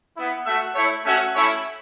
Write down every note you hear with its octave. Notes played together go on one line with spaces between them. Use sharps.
B3 E4
A3 F#4 E5
A3 E4 C#5
A3 C#4 F#4 E5
A3 C#4 E4 C#5